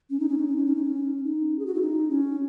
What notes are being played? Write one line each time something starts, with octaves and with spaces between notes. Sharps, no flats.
C#4
D#4
C#4
D#4
C#4
D#4
C#4
D#4
C#4
D#4
G#4
F#4
E4
D#4
C#4